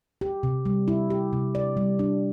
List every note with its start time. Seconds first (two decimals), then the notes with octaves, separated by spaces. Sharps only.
0.21 G4
0.43 C3
0.65 G3
0.88 E4
1.10 G4
1.33 C3
1.55 D5
1.77 G3
1.99 D4